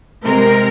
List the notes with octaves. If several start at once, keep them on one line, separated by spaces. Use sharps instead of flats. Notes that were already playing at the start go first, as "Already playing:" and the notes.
C3 G#3 C4 A#4